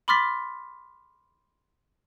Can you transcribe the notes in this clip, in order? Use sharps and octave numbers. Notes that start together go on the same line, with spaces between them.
B5 C6 D6 F6 A6 B6